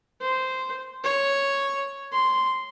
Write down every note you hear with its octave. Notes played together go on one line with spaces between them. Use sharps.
C5
C#5
C6